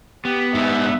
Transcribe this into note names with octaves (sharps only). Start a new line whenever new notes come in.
B3 G4
G#2 G3 E5